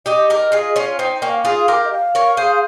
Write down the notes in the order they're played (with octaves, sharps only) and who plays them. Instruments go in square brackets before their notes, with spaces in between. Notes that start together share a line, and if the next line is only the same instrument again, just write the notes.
[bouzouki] D#4 G4 [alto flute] D#5
[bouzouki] G4 A#4
F4 G#4
C#4 F4
[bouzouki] C4 D#4 [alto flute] G5
[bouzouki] A#3 C#4 [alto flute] G5
[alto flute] F5
[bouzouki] F4 G#4
[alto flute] F5
[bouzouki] G4 A#4
[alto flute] D#5
F5
[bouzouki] A#4 C#5
G#4 C5